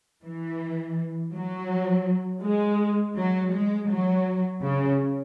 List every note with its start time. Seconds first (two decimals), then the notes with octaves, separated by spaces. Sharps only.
0.24 E3
1.33 F#3
2.43 G#3
3.15 F#3
3.52 G#3
3.88 F#3
4.61 C#3